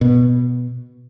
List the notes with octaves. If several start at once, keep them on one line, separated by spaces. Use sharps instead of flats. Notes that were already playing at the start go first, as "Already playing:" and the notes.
B2